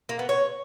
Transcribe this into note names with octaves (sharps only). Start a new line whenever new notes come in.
A#3
B3
C#5